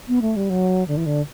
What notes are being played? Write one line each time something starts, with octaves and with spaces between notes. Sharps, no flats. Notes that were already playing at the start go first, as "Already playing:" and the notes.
B3
A3
G3
F#3
D3
E3
D3